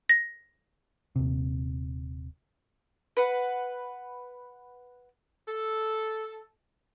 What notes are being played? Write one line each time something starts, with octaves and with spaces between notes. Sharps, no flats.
A#6
D#1 C3
B4 F#5
A4